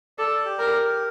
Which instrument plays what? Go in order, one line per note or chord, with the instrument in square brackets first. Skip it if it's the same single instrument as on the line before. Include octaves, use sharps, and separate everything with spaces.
[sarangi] A4 [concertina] D5
[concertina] G4
[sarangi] A#4
[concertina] A#4